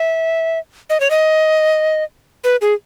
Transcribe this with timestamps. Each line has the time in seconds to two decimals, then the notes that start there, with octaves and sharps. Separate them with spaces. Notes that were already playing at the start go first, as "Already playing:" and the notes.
Already playing: E5
0.90 D#5
1.00 C#5
1.11 D#5
2.44 B4
2.61 G#4